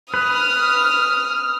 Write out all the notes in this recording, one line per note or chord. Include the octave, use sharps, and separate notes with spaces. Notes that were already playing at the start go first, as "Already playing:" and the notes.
B4 D#6 F6